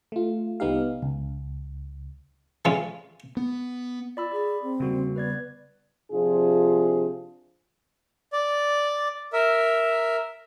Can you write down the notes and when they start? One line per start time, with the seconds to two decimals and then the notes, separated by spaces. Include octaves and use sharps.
0.12 A3 F4
0.60 C2 B3 D#4 G4 F5
1.03 C#2
2.65 E3 G3 G#3 C#4 F4
3.37 B3
4.17 F4 D5 B5 E6
4.32 G#4 D5 B5
4.63 C4
4.80 C#3 G3 A#3 F#4
5.16 B3 B4 D5 G#6
6.12 C3 F3 D4 F4 G#4
8.33 D5
9.33 A#4 E5